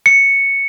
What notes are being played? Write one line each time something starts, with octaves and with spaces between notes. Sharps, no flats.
C#7